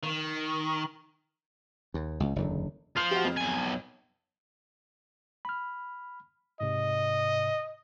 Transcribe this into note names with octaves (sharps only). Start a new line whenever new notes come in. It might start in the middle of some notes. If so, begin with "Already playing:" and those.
D#3
D#2
C#2
F#1 E2 D3
F4 C5 F6 C7 F7
F#4 G4
F2
B1 G#5
B5 F6
G#2 C3 D#5